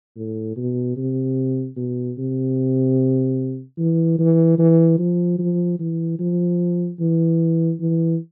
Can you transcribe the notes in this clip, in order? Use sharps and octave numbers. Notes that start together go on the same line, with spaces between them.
A2
B2
C3
B2
C3
E3
E3
E3
F3
F3
E3
F3
E3
E3